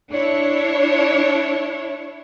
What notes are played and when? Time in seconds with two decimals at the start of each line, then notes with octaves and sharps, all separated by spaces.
0.10 D4 E4 C#5